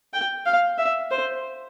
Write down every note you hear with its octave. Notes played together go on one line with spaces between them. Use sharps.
G5
F5
E5
C5